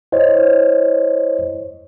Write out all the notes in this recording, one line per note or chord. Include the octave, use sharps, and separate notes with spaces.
E4 C5 C#5 D#5